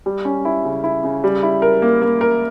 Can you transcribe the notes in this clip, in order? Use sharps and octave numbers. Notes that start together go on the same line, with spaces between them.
G3
C#4
E4
C#3
E4
C#3
G3
E4
A#4
A#3
A#3
A#4